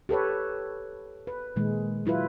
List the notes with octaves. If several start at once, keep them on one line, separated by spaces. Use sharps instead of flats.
G4 A4 B4 C#5
B4
A#2 D#3 G#3
F#3 E4 F4 B4